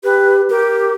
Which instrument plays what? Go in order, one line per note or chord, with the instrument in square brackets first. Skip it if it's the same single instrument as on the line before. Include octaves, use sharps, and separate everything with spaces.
[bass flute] G4 [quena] B4
[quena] G4 [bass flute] A#4